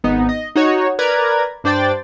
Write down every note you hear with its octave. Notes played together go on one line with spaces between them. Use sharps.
G#1 B3 D#4
D#5
D#4 F#4 C#5
A#4 B4 D5 A#5 G#6
G2 D4 C5 D5 G5 A6